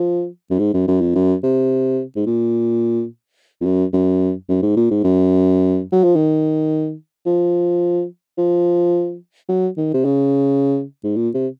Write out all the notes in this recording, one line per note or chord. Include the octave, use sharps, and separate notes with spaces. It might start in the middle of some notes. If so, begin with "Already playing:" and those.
Already playing: F3
F#2
G#2
F#2
F#2
F2
F#2
C3
G#2
A#2
F2
F#2
F#2
F#2
G#2
A#2
G#2
F#2
F#3
F3
D#3
F3
F3
F#3
D#3
C3
C#3
G#2
A#2
C3